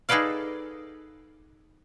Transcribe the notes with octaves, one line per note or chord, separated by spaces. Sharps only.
D#4 G#4 A4 B4 D5 F5